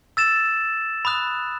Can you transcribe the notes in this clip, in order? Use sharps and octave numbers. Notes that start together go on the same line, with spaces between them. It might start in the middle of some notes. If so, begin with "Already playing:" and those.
E6 A6 E7
B5 D#6 F#6